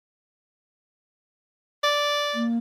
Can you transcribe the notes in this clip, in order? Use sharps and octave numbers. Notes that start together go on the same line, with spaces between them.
D5
A#3